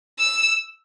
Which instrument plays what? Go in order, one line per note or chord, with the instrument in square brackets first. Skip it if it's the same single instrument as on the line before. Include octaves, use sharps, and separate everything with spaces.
[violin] E6